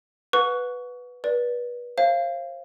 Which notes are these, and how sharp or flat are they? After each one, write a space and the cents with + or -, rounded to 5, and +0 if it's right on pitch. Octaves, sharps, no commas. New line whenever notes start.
B4 +0 F#5 -35 C#6 +25
B4 -30 D5 +0
C5 +40 F5 -20